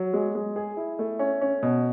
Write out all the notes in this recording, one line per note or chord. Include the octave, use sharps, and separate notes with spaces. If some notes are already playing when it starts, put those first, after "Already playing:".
Already playing: F#3
G#3
G#3
G#4
E4
A3
C#4
C#4
B2